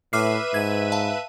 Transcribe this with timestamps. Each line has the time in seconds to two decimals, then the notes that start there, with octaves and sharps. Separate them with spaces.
0.13 A2 B4 E5 D6 F6 C7 D#7
0.54 G#2 G#6
0.92 F5 A5